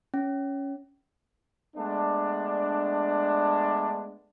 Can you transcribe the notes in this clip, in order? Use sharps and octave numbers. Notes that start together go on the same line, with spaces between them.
C#4
G#3 A3 B3 D4